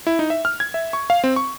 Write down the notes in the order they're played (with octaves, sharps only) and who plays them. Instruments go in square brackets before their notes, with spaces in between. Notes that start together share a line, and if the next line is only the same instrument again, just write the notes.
[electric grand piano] E4
D#4
E5
F6
G#6
E5
C#6
F5
C4
C#6